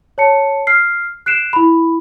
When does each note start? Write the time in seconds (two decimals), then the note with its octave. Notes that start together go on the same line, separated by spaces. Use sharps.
0.18 C#5 A5 C#7
0.67 F6 C7
1.26 F#6 C7 D7 E7
1.53 E4 B5